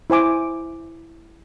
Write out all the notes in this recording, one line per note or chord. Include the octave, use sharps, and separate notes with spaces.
E4 C5 G#5 D6